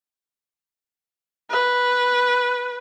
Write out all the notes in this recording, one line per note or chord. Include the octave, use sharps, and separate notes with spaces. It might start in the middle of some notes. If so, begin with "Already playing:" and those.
B4